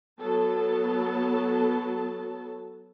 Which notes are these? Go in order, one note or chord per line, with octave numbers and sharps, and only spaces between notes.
F#3 B3 A4 A5